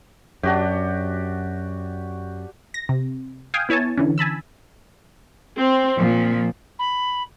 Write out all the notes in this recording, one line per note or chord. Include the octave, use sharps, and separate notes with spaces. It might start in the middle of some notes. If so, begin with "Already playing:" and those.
F#2 D4 F#4 G4
A#6
C3
F5 G5 G#5 D#6
B3 E4 C#5 G#5 A5
D3 E3 C#4
G#5 A5 B5 E6
C4
A#2 F3
B5